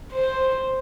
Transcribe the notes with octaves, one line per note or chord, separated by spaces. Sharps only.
C5